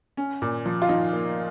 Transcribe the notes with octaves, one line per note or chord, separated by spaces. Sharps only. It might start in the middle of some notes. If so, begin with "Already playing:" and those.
C#4
A#2
F3
F4
F3 D#4
A#3